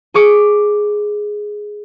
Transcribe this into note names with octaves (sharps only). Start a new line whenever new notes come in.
G#4 C#6 D6 C#7